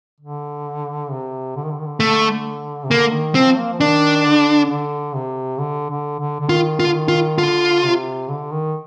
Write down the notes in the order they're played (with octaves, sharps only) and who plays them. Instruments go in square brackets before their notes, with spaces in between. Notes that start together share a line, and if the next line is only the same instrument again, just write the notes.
[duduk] D3
C3
D3
D#3
D3
D#3
D3
[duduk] D3 [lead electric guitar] A3
[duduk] C3
[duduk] D3 [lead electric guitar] A#3
[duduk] D#3
[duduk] F3 [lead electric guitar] C4
[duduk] A#3
F3
[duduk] D#3 [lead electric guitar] D4
[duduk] D3
D3
C3
D3
D3
D3
D3
[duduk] D#3 [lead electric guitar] F4
[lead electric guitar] F4
[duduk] D3
D#3
[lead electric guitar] F4
[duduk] D3 [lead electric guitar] F4
[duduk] C3
D3
D#3